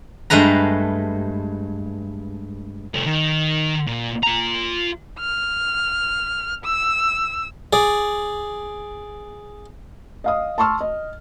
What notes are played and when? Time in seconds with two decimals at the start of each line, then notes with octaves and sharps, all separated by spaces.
0.30 G2 G#3 A3 B4 A#5
2.94 C2 A3
3.06 D#3
3.87 A#2
4.23 F4 A#5
5.19 F6
6.64 E6
7.73 G#4 D5
10.24 D#5 F5 D#6
10.58 A5 C6 C#6 E6 F6
10.81 D#5